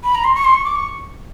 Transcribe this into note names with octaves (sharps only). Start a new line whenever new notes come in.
B5
A#5
C6
C#6
C6
C#6
D6
C#6